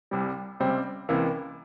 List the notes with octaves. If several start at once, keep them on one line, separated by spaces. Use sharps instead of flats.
C2 C3 G3
C#2 C3 G3 C4
C#2 C3 E3 A#3